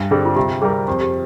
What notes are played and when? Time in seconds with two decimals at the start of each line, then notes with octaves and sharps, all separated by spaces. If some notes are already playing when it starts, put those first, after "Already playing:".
Already playing: G2
0.11 D3 G3 C4 G#4
0.25 F4
0.36 C3 G4
0.62 G3 C4 G4 G#4 A#4
0.88 F2 G4
1.01 G4